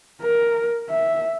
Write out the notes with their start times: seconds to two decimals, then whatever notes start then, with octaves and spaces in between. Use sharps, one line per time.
0.22 A#4
0.89 E5